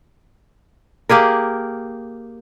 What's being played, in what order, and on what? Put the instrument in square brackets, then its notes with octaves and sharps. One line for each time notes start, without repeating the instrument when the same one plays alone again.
[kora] A#3 G4 G#4 A#4